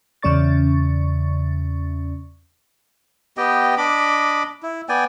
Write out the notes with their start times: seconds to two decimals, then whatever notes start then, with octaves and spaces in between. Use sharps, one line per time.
0.22 E2 C#3 C#4 D5 C#6 A6
3.37 B3 G4 D#5 G5
3.78 D4 D#5 B5 D6
4.63 E4
4.89 B3 D5 G5 G#5